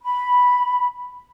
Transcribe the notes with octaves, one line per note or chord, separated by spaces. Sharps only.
B5